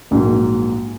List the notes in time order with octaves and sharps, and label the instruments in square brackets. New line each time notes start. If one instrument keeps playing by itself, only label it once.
[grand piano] A#1 G#2 F#3 A#3